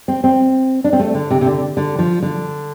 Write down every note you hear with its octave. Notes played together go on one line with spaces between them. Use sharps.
C4
C4
D4
C4
A3
D3
C3
C3
D3
D3
F3
D3